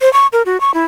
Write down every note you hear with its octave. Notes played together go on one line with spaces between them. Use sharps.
C5
C#6
A#4
F#4
C#6
E4